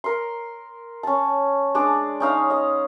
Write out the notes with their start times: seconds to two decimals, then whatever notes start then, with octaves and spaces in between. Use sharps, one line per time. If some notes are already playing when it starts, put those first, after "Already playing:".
0.04 A#4 C6
1.03 C#4 A5
1.75 G#3 D4 D5
2.20 C#4 D#4 F5
2.50 D#5